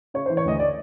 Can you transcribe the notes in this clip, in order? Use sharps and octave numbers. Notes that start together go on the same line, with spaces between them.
C#3 C#5
C5
E3
C#5
D2 D#5
D5